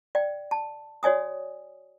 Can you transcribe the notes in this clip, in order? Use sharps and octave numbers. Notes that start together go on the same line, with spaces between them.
D5 G5
A5
F#4 C#5 D5 G#5 D#6